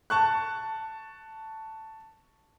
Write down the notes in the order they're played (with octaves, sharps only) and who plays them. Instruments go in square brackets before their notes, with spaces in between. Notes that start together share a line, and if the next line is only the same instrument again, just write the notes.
[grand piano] A5 C#6 F#6